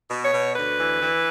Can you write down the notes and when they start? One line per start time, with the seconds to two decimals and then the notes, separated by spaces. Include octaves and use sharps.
0.09 B2
0.24 C#5
0.32 B2
0.55 D2 B4
0.78 E3
1.02 E3